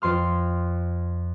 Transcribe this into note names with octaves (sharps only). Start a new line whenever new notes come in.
F2 C6 F6